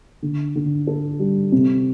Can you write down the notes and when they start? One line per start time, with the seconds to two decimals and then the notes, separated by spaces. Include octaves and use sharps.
0.22 D3
0.55 D3
0.87 A4
1.19 G3
1.52 C3